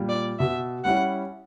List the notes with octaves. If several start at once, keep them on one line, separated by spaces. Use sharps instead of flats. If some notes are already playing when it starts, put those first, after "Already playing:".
Already playing: A#2 G3
D5
B2 E5
G3 C#4 E4 F#5